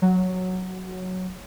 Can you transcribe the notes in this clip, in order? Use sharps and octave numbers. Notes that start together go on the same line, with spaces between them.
F#3